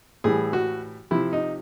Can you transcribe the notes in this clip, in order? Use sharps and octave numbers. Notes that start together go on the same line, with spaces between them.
A2 E3 G3 G#4
F#4
C3 F3 E4
D#4